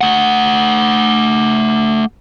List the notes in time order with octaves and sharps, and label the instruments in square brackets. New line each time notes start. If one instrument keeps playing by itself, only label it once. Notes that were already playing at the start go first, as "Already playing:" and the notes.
[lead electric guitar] A3 F#5